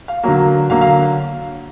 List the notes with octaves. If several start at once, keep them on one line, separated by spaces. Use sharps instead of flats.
F5
D3 F#3 A#3 F5
D3 F#3 A#3 F5
F5